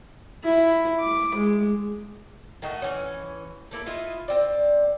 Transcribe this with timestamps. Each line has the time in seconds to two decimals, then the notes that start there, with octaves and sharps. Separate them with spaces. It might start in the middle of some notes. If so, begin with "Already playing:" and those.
0.44 E4
1.00 D6
1.35 G#3
2.62 D#3 A3 F#4 D#5
2.82 E3 C#4
3.71 A3 A#3 E4
3.86 E4 F4 D#5 E5
4.28 C4 D5